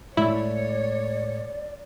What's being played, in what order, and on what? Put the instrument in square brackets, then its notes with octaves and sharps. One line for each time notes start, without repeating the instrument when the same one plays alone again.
[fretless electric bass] A2 G#3 A3 [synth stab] E4 [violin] C#5 [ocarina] D5